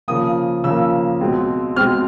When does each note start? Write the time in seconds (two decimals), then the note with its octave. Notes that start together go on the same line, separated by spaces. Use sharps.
0.08 C#3 F3 A#3 D#6
0.64 C#3 F3 A#3 E6
1.21 B2 G#3 C4
1.76 B2 G#3 C4 F6